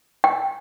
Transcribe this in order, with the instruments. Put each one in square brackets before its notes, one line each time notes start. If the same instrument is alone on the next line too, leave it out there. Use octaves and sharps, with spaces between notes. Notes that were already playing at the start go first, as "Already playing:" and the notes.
[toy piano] G5